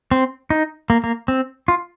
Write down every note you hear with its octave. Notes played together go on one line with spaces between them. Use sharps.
C4
D#4
A#3
A#3
C4
F4